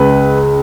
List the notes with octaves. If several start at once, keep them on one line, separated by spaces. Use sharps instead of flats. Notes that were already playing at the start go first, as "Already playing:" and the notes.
Already playing: C#2 C#3 G#3 B4